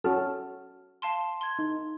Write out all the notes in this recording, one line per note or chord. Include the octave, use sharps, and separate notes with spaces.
C#4 F#4 A4 F6
F5 A5 C6
C6 G#6
D#4